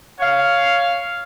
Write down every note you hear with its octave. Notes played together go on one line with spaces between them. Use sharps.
C#5 F5